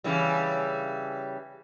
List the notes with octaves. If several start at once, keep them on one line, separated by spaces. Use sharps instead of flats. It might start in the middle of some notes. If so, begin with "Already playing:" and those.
C#3 E3 G3